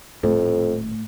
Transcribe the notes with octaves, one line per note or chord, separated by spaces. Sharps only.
D#1 F2 A2